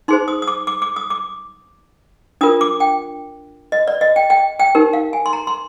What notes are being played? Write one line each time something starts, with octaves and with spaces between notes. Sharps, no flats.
D#4 G#4 C5 C6
D#6
D#6
D6
D6
D6
D#6
D6
D4 F4 A#4 D#6
D6
G5
D#5
D5
D#5
G5
G5
G5
D#4 G4 A#4
F5
G#5
C6
A#5
C6